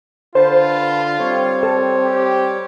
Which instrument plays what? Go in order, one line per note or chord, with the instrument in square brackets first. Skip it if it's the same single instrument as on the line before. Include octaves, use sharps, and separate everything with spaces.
[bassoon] D3 [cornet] F4 [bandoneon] B4 A5 [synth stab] C5
[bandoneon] G3 C#5 [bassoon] C4
[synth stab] A4
[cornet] G4